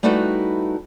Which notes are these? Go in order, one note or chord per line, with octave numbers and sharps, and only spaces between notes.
G3 A3 D#4 E4 F#4 B4